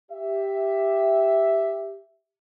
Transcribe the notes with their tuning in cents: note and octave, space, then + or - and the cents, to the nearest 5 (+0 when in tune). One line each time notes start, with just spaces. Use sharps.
G4 +0 E5 +0